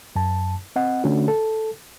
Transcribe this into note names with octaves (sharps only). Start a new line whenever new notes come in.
F#2 A5
C4 D#5 F#5
D3 A3 C#4 D4 F#4
A4